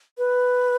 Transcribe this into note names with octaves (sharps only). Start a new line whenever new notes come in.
B4